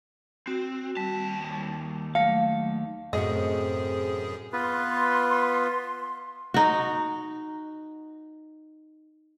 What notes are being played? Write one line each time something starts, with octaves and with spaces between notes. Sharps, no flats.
C4 F#4
D#2 G3 A5
F#3 A3 F5
F#2 A2 C3 C4 F#4 G#4 D#5
B3 F4 B4 C6
D#4 F#4